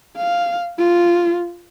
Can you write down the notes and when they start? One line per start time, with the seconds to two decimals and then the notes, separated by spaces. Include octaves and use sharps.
0.17 F5
0.78 F4